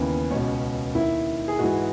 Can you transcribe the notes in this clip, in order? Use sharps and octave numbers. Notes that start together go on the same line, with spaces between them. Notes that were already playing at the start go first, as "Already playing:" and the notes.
Already playing: D#2 C#3 E3 B3
C#2 B2 C#4
D#2 D#3 E4
G#4
G#2 E3 F#4